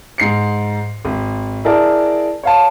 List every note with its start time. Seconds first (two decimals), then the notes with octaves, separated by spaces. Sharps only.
0.18 G#2 C7 C#7
1.05 G#1
1.65 E4 G#4 A#4 D5 A5
2.43 C#5 F5 A5